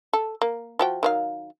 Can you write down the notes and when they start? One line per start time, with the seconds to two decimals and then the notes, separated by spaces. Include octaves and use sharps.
0.13 A4
0.42 A#3
0.79 F3 F#4 G5
1.03 D#3 F#3 F5